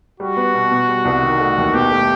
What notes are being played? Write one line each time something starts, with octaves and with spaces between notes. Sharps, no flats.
G3 F#4
B3
B2
B2
G3
C2
D#3
A3
D#2
B2 G4
A3